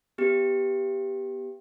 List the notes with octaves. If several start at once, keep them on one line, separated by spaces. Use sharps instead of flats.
B3 G4